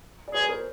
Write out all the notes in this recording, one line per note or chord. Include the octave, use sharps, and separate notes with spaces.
D5
G#4 B4 C#5
A#4 C5